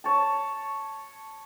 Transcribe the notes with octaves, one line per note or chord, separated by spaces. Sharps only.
C#5 A5